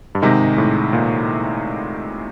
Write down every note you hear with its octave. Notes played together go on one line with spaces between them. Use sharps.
G2
G#2 C3 D#3 G#3
A2
A#2